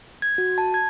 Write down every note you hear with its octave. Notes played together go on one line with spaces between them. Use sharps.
G#6
F#4
A5
G#6